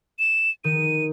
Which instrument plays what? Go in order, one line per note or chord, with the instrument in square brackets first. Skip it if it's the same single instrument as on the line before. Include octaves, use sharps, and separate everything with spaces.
[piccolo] E7
[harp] D#3 [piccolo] D#7